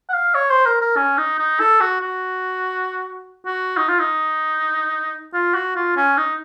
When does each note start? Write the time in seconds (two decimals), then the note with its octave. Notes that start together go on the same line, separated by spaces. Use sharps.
0.09 F#5
0.14 F5
0.35 C#5
0.50 C5
0.66 A#4
0.81 A#4
0.97 C#4
1.18 D#4
1.39 D#4
1.60 A4
1.81 F#4
2.00 F#4
3.46 F#4
3.77 D#4
3.89 F4
3.99 D#4
5.34 F4
5.54 F#4
5.76 F4
5.97 C#4
6.18 D#4